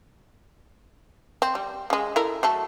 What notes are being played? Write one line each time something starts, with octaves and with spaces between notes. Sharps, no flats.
C4
G3
C#3 G#3
E4 A4 A#4
F#3 A3 A4